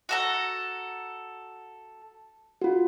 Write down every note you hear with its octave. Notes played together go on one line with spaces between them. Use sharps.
F#4 A4 A#5
F4 F#4